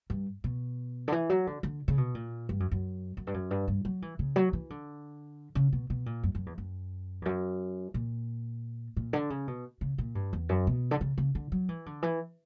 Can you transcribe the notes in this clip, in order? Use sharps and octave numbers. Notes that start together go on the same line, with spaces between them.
G2
B2
D3
E3
F#3
D3
D3
C#3
B2
A#2
G2
F#2
F#2
F#2
G2
F#2
G2
G2
F#3
E3
C#3
F#3
E3
D3
C#3
B2
B2
A#2
F#2
F#2
E2
F#2
E2
F#2
A#2
A#2
D3
C#3
B2
C#3
A#2
G2
E2
F#2
B2
D3
C#3
C#3
D3
F#3
E3
D3
E3